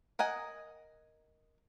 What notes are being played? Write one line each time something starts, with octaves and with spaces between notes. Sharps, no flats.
A#4 D#5 F#5 G#5